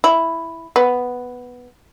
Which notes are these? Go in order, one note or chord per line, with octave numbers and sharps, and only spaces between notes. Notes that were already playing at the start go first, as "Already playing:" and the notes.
E4
B3